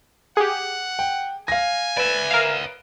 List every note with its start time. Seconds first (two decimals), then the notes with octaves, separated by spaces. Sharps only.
0.37 G4 G#4 F#5
0.99 G5
1.48 F5 G#5 A#6
1.97 B4 D5 E5
2.30 A#4 F5